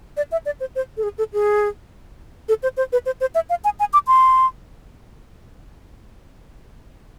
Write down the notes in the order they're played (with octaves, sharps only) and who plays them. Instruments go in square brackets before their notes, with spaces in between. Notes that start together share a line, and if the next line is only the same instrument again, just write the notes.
[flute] D5
E5
D5
C5
C5
A4
G#4
A4
G#4
A4
C5
C5
B4
C5
C5
E5
F5
G#5
G#5
D6
C6